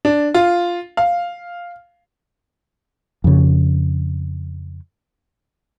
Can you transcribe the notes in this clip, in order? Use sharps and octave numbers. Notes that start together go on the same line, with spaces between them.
D4
F4
F5
F2 C#3